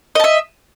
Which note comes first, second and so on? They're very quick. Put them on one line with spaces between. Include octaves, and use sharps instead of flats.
D#5 A5 E5